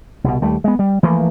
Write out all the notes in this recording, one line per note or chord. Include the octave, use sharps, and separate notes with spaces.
C2 B2
D#2 G3 A3
G#3 B3
G3
E3 F3 A3 A#3